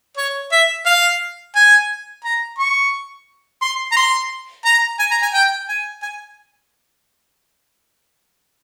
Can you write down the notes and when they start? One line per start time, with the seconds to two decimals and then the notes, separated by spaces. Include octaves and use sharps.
0.17 C#5
0.52 E5
0.86 F5
1.56 G#5
2.25 A#5
2.59 C#6
3.62 C6
3.92 A#5
3.97 C6
4.65 A#5
4.99 G#5
5.11 A#5
5.22 G#5
5.34 G5
5.68 G#5
6.02 G#5